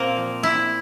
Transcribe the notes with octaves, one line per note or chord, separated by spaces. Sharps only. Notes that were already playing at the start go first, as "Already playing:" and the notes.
Already playing: A#2 A#3 C4 A#4
F3
A#2 E4